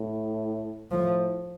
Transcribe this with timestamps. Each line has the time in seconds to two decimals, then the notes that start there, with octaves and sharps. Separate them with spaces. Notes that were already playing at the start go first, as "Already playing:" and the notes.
Already playing: A2
0.91 A2 F3